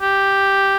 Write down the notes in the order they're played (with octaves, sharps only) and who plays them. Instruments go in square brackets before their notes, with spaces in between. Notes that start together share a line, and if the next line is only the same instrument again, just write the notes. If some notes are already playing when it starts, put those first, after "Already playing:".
[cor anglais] G4